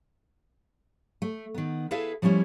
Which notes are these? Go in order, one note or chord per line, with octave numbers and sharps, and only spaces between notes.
A3
D#3 B3
E4 G#4 A4 B4 E5 F5
F3 G3 A3 C#4 E4